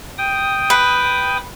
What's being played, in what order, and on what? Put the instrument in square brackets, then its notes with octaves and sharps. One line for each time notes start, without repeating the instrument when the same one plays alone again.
[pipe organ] G5 D#6
[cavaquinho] B4